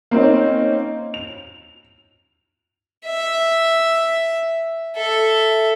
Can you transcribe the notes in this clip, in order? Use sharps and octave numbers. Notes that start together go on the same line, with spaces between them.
A#3 C4 C#4 D#4
F7
E5
A4 E5